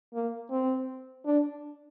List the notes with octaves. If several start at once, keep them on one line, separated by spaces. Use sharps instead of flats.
A#3
C4
D4